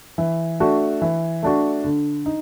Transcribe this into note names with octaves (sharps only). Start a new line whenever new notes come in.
E3
A3 D4 F#4
E3
A3 D4 F#4
D3
D#4